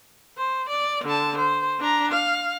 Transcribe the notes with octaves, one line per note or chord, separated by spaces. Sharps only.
C5
D5
D3 A5
C5
D4 A#5
F5